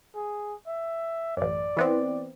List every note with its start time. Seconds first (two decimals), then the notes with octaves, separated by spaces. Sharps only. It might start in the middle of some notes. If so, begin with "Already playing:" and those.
0.15 G#4
0.67 E5
1.37 A1 F#2 D5
1.77 E3 B3 C4